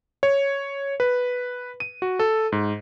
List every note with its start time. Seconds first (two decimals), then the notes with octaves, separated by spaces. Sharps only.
0.23 C#5
1.00 B4
1.80 D#7
2.02 F#4
2.19 A4
2.52 G#2